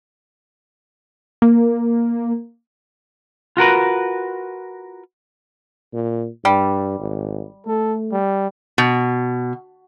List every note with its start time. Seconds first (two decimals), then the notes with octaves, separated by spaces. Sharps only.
1.42 A#3
3.57 F4 F#4 A#4 B4
5.93 A#2
6.45 G2 G3
7.00 G#1
7.67 A3 A4
8.11 G3
8.78 B2